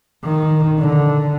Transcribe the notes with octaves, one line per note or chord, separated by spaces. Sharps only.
D#3
D3